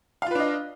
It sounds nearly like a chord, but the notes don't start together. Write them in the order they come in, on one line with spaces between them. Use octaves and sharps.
F5 F4 B4 D4 D#5